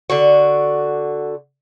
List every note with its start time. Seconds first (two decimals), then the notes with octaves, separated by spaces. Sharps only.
0.10 D3 F#4